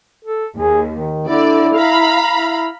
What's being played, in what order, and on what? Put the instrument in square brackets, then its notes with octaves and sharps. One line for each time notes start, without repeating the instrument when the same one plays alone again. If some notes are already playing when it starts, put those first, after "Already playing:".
[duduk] A4
[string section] D#2 [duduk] G#4
[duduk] D#3
[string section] D3 D5 [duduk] E4
[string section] F5 A#5 B5
[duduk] E4